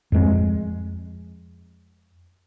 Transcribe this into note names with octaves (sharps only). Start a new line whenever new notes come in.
F2 G#3